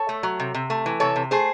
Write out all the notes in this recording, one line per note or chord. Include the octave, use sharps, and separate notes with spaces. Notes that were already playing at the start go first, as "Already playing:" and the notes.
Already playing: A4 C#5
A3
F#3
C3
C3
A3
E3
C3 A4 C#5
C3
A3 G#4 C5